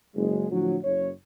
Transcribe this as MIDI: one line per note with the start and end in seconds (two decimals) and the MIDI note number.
0.16 0.50 30
0.16 0.50 56
0.50 0.75 45
0.50 0.75 50
0.50 0.75 53
0.50 0.75 54
0.83 1.09 30
0.83 1.09 73